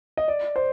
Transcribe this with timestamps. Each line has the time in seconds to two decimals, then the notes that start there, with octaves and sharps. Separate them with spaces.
0.17 D#5
0.28 D5
0.56 C5